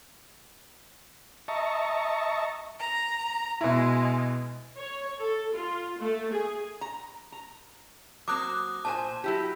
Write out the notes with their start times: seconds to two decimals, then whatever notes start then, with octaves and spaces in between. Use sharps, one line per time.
1.48 D#5 E5 A5 A#5 C#6
2.78 A#5
3.61 B2 G#3 E4
4.76 C#5
5.19 A4
5.53 F4
5.98 A3
6.31 G#4
6.81 A#5
7.32 A#5
8.28 F#3 A#3 C4 D6 D#6 F#6
8.85 A#2 C5 G#5 A5
9.24 F#3 E4 G4